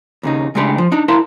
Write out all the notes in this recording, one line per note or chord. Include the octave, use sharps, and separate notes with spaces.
D#2 C#3 D#4
C#3 G#3 A3 D4 G4 B4
F3
D4 D#4
E4 A#4 B4 F5 A5 C6